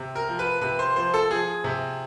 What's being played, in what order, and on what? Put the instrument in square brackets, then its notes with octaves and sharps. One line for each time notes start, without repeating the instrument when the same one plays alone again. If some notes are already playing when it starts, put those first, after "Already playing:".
Already playing: [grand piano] C3
A#4
F3
B4
C3 B4
C5
F3 C5
A4
F3 G#4
C3